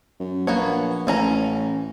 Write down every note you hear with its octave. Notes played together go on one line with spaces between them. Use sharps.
F#2
A#1 A#3 B3 C#5
A1 E3 C#4 A#5